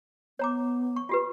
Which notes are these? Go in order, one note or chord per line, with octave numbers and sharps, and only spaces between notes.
B3 C#5 A#5 D6
C#6
F4 G4 B4